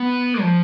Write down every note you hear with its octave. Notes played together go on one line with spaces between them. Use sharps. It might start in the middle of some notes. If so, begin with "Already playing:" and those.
Already playing: B3
F3